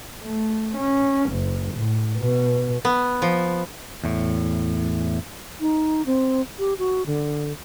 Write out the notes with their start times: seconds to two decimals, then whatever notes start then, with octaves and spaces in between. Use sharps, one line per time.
0.22 A3
0.76 C#4
1.31 F#1
1.73 A2
2.19 B2
2.85 B3
3.22 F3
4.04 E2 A2
5.61 D#4
6.06 C4
6.59 G4
6.79 F#4
7.06 D3